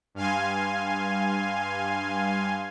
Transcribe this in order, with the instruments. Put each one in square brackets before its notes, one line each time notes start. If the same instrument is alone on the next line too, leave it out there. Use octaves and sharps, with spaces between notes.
[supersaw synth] G2 F5 G#5 C6